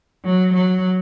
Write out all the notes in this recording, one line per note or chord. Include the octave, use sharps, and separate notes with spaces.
F#3
F#3